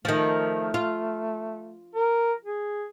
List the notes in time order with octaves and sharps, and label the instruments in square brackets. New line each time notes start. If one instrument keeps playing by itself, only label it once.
[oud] D#3 F3 [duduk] A3
[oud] F4
[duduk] A#4
G#4